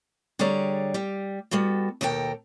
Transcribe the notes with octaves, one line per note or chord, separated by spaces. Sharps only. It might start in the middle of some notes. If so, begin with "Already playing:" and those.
D3 G3 G#4 C#5 D5 A#5
G3 G4
G3 B3 F#4 A4
D#2 B2 A4 A#4 G5